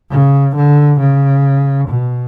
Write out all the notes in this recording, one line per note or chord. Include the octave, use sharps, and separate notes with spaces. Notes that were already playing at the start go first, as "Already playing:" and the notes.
C#3
D3
C#3
B2